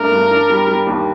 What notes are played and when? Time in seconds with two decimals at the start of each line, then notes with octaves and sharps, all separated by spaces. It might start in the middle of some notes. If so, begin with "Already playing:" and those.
Already playing: G2 A3 D4 A#4
0.12 G2
0.31 D4
0.50 G3
0.67 G3
0.87 D#2